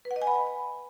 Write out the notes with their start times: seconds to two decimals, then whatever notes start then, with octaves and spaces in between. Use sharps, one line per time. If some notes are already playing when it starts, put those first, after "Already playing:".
0.05 B4
0.11 F#5
0.16 D#5
0.22 G#5
0.27 B5